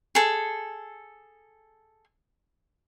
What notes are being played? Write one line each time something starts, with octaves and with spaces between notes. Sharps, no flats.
G#4 A4